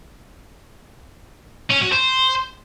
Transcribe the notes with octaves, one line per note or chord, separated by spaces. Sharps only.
C#4
F#4
C5